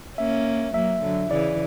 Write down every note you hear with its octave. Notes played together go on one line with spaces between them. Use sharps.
A#3 C#4 E5
F#3 A#3 E5
D3 F#3
C#3 E3 D5